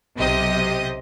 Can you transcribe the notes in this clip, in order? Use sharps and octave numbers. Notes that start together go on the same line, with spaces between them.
B1 C3 G4 C5 D#5 D#6